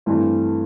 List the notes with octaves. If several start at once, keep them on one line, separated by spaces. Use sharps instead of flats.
G2 E3 A3 C4